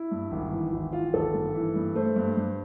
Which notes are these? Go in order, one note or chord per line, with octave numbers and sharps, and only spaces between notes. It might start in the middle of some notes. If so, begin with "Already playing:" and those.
Already playing: E4
G2
G#1
E3
G#1 E4
E3 F4
G#1 A4
G2
E3
G2
A3 C5
G2
G2